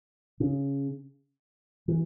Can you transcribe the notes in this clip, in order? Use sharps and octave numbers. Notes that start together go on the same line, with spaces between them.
C#3
E3